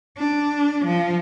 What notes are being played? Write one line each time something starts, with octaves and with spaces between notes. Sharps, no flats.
D4
F3